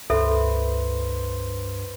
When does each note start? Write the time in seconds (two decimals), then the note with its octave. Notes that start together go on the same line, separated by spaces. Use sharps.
0.10 C#2 G2 A4 B4 C5 E5